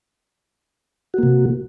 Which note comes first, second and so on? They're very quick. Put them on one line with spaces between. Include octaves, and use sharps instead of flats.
F#4 A#3 C3